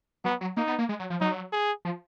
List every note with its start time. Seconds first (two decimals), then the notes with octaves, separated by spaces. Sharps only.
0.25 F#3 B3
0.41 F#3
0.57 A#3 D#4
0.67 B3
0.79 A#3
0.89 G#3
0.99 F#3
1.10 F3
1.21 F#3 D#4
1.53 G#4
1.85 F3